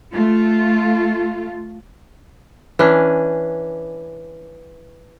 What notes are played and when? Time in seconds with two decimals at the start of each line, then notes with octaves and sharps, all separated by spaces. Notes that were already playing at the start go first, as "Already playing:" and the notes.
0.12 A3 F4
2.79 E3 C#4 D4